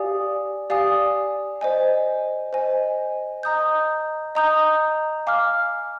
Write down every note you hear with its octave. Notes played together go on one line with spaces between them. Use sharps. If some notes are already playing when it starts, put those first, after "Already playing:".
Already playing: G4 D5 F5 G#5 D#6
G4 D5 F5 G#5 D#6
C5 D#5 G#5
C5 D#5 G#5
D#5 A#5 D#6 G6
D#5 A#5 D#6 G6
F5 G#5 D6 F6